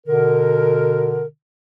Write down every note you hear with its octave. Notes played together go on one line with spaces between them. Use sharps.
B2 D3 A#4